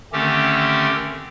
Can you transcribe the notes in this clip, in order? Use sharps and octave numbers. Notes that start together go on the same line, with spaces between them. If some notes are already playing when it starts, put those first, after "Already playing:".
D3 D#3 A3 C4 C#4 G4